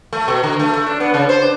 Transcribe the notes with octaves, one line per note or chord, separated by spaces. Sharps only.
A3
B2
D3
A3
A3
D4
B3
C#3
C5
D4